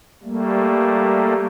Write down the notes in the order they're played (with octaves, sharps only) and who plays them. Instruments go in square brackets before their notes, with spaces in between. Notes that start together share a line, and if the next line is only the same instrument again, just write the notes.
[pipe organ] G3 A3 A#3